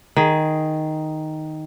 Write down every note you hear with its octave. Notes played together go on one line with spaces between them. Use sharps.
D#3 G#4